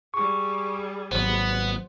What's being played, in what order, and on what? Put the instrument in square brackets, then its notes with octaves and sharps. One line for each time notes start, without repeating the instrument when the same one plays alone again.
[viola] G3 G#4 [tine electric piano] C#6
[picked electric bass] G#1 F#3 [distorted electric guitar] B3 [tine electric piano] C5